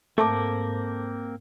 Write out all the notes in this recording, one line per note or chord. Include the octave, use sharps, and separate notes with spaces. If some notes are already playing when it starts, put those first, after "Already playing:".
G#2 A3 A#3 C4 A4 A#4 A5 D6